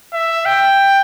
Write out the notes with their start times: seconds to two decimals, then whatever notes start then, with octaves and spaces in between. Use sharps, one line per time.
0.13 E5
0.46 G5